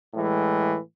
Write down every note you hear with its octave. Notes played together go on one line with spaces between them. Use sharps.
A2 E3 G#3